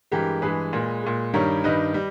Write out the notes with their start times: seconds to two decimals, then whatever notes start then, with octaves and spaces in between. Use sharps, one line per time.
0.12 G2 E3 G#3 G4 A#4
0.42 G2 E3 G#3 G#4 B4
0.73 A#2 G#3
1.04 A#2 G#3
1.34 G2 D#3 G3 A#4 C#5
1.64 G2 D#3 G3 B4 D#5
1.94 G3